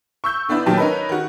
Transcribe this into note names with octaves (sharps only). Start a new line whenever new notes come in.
C#6 E6 G6
D3 B3 D4 E4
A#2 D#3 F#3 G4 A5
C#4 D#4 A#4 B4
D#3 F#4